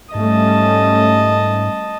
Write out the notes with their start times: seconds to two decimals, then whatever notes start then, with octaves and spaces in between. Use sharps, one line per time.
0.15 G#2 G3 A3 C#4 D#5 A5